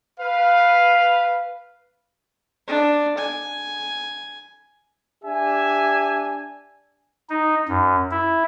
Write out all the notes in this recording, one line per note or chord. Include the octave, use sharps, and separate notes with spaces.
B4 F5
D4
G#5
D4 G4 E5 G#5
D#4
F#2
E4